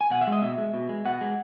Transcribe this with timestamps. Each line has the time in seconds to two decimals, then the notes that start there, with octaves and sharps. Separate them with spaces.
0.01 G#5
0.10 B2 F#5
0.21 E5
0.27 G#3
0.32 D#5
0.42 B2 E5
0.58 G#3
0.74 B2
0.89 G#3
1.05 B2 F#5
1.21 G#3